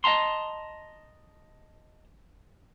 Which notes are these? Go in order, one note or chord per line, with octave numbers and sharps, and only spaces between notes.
D#5 E5 A5 A#5 C6